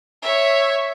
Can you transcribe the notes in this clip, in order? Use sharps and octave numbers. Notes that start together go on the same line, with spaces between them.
C#5 E5